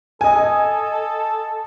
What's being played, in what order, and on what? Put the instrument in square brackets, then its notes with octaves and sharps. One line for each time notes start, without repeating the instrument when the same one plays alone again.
[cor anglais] A4 [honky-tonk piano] D#5 G#5